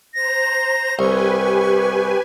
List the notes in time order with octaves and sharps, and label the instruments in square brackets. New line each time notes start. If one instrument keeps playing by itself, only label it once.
[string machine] C5 A#5 [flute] A#6
[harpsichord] C2 [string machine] G4 B4 G#5 [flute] C#6